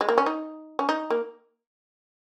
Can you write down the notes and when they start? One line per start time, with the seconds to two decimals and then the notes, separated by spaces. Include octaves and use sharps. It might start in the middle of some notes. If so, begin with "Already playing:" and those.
0.01 G#3
0.09 A#3
0.18 C#4
0.26 D#4
0.79 C#4
0.89 D#4
1.10 A#3